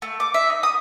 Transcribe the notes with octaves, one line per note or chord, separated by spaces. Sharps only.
A3
D6
E5
D#4
D#6